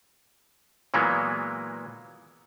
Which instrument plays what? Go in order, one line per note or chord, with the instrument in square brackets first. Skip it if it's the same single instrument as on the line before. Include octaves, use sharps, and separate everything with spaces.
[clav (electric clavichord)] A#2 E3 F#3 G#3 A#3 B3